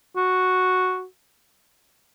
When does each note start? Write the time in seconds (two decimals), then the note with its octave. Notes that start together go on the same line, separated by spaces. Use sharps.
0.17 F#4